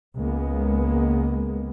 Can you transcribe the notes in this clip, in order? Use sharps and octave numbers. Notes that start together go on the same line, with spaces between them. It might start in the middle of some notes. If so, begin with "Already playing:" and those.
C#2 G#3 A#3 B3